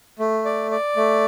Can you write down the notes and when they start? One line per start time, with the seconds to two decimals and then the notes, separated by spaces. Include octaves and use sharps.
0.19 A3
0.45 D5
0.71 D5
0.96 A3